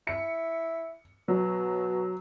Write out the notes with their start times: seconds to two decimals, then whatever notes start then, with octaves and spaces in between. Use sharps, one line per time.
0.07 E4 C#7
1.28 B2 F#3